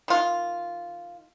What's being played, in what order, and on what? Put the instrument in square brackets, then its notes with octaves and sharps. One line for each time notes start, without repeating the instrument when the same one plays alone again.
[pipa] D#3 F4